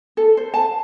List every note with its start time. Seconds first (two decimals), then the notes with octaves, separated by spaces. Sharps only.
0.17 A4
0.37 C5
0.54 A5